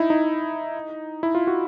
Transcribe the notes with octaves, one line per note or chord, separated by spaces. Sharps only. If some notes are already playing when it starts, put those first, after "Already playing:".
Already playing: D#4 E4
D#4
E4
F4
F#4